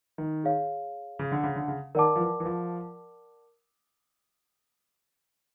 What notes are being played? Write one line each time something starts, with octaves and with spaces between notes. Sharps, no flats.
D#3
G#4 C#5 F5
C#3
D3
C#3
D3
C#3
D#3 A#4 D5 F#5 A5 D6
F3
E3
E3
F3